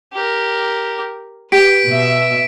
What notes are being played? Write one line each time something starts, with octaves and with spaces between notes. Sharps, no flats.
G4 A#4
G4 B4 B6 D7
B2 E5